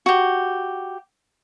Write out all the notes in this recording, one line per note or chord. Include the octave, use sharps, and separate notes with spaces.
F#4 G4